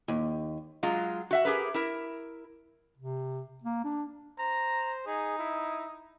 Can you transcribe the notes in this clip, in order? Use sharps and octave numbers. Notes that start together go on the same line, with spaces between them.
D#2
F#3 G#3 F4
F#4 E5 F#5
G4 G#4 A#4 B4
E4 A#4
C3
A#3
D4
C5 A#5
D#4 G#4
E4